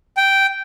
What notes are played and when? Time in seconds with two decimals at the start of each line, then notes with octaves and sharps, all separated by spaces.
0.17 G5